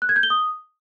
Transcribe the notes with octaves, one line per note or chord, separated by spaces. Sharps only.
F#6
G#6
G6
G7
D#6